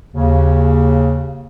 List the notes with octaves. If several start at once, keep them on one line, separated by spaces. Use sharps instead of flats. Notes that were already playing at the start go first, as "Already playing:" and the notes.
D#2 C#3